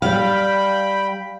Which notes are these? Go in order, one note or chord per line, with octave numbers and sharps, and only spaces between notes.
G3 F5 G5 B5